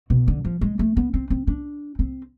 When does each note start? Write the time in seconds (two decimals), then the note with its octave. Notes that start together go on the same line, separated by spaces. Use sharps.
0.10 B2
0.28 D3
0.45 F3
0.61 G#3
0.79 A3
0.97 B3
1.14 C4
1.30 C4
1.47 D4
1.99 C4